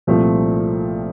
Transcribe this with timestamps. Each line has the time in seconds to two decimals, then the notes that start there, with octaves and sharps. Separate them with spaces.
0.07 C2 A#2 F3 A3 C4